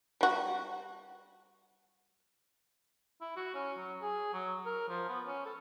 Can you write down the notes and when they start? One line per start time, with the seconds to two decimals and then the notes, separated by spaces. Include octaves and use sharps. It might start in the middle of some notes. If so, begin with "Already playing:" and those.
0.21 G3 F#4
3.21 E4
3.36 F#4
3.54 C#4
3.77 F#3
4.02 G#4
4.33 F#3
4.66 A#4
4.88 F3
5.09 B3
5.26 C#4
5.46 A4